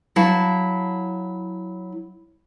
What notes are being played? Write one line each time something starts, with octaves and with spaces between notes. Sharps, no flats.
F#3 E4 F5 A5